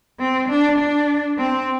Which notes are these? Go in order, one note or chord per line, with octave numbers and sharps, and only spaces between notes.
C4
D4
D4
C4